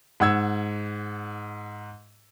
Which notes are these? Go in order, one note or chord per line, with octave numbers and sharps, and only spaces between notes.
G#2 F#5 E6 G#6